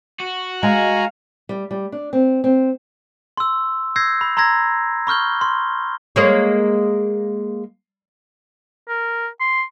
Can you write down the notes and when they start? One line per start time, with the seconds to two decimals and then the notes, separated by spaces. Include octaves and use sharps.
0.20 F#4
0.63 G#3 F5 G#5 A#5
1.49 G3
1.71 G3
1.92 D4
2.13 C4
2.44 C4
3.37 C6 E6
3.96 E6 G6 G#6 A#6 C7
4.21 B5
4.37 A#5 C6 E6 G#6 A#6
5.07 B5 C#6 F6 G6 G7
5.41 C6
6.16 G#3 A#3 C#5
8.89 A#4
9.40 C6